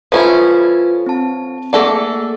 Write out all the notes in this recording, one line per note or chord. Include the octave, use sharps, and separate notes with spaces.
F3 C#4 E4 F4 A4 B4
C4 A5
A3 A#3 G#4 A4 D5 F#5